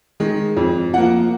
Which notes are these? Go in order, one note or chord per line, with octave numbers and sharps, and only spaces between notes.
D#3 G#3
F2
F3 A#3 F#5